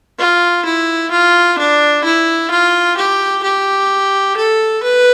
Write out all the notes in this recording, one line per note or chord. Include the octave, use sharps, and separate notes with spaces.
F4
E4
F4
D4
E4
F4
G4
G4
A4
B4